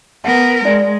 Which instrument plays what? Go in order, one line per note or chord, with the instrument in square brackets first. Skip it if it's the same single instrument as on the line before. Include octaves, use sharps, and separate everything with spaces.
[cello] B3 A#4 [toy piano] F#5 A5
[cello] G#3 [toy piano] D#4 D5 G5